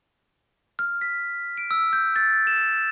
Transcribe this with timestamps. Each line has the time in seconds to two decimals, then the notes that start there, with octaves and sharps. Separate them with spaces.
0.79 F6
1.01 B6
1.57 D7
1.71 E6
1.93 G6
2.16 A6
2.47 E7